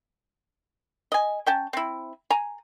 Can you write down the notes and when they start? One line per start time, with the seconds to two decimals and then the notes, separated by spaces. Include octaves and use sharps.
1.12 D#5 G#5
1.46 C#4 G5 A5
1.73 C4 E4
2.30 G#5 A#5